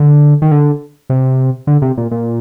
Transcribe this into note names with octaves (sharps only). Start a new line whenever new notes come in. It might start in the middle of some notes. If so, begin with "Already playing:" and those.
Already playing: D3
D#3
D3
C3
D3
C3
A#2
A#2